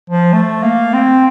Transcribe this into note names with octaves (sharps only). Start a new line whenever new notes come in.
F3
A3
A#3
C4